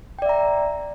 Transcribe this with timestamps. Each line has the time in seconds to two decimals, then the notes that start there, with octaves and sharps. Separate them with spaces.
0.19 G5
0.22 D5
0.26 E5
0.29 A#5